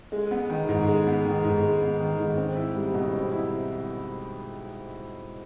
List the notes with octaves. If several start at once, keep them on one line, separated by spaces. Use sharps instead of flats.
G#3
B3
D#3
G#2
G#3
B3
D#3
G#2
G#3
B3
D#3
G#2
C4
E4
G3
B2
C4
E4